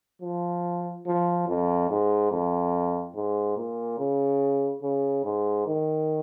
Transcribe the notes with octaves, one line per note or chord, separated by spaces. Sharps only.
F3
F3
F2
G#2
F2
G#2
A#2
C#3
C#3
G#2
D#3